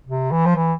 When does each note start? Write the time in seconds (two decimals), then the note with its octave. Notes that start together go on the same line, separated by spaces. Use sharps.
0.07 C3
0.31 E3
0.46 F3
0.56 E3